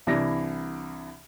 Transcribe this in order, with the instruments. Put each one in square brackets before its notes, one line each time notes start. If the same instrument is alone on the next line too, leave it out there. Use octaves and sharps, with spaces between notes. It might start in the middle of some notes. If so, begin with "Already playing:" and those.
[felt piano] C2 E3 D4 E4 A#6